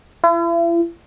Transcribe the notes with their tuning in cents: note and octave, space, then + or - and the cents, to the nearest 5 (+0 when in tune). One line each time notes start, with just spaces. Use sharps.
E4 +45